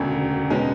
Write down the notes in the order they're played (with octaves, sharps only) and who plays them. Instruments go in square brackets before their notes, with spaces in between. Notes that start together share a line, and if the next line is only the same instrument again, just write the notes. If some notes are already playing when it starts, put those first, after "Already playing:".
Already playing: [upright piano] E1 D2 C#3
B2 G#3 C#4